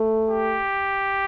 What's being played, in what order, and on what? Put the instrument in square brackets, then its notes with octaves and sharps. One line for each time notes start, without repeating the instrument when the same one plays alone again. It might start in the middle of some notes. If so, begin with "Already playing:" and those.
Already playing: [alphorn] A3
[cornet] G4